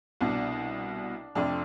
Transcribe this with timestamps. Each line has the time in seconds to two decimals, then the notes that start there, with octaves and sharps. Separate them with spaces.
0.21 C2 B2 D4
1.35 F1 F2 C3 D4